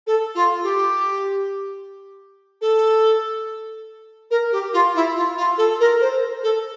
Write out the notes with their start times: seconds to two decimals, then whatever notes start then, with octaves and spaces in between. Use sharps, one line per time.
0.07 A4
0.35 F4
0.63 G4
2.61 A4
4.30 A#4
4.52 G4
4.73 F4
4.95 E4
5.15 F4
5.37 F4
5.57 A4
5.80 A#4
6.01 C5
6.43 A4